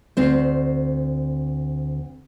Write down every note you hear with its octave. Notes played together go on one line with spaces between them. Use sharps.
D2 C4 C5